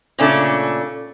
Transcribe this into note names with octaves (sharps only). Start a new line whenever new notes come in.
A#2 C#3 A3 C#4 D4